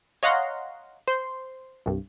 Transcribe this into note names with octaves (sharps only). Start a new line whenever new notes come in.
C#5 D#5 F5 F#5 A#5 C6
C5 C6
C2 G2